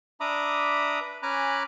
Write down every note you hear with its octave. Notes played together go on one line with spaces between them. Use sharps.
D4 E5 A#5 B5 D6 D#6
B4
C#4 G#5 A#5 B5 D6 F#6